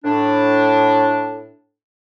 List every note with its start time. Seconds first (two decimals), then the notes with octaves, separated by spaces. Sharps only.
0.05 A2 D4